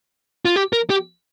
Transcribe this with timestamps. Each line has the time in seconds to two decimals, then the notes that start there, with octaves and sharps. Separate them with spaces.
0.45 F4
0.56 G4
0.73 A#4
0.90 G4